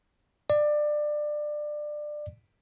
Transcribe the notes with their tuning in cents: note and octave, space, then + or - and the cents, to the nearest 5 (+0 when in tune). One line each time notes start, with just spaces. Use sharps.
D5 +20